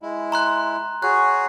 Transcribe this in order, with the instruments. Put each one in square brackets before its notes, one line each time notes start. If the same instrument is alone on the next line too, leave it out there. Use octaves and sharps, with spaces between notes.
[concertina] G#3 E4
[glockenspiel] A#5 C6 F#6
[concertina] F#4 G#4 C#5 [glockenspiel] F#6